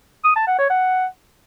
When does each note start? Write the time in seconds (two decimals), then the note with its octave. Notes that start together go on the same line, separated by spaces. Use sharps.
0.24 D#6
0.36 A5
0.47 F#5
0.59 C#5
0.70 F#5